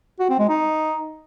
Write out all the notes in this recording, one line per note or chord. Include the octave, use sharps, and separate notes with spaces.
F#4
C4
G#3
D#4